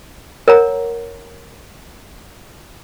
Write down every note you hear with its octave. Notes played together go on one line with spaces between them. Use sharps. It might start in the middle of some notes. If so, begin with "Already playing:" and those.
A#4 C#5 F#5 A#5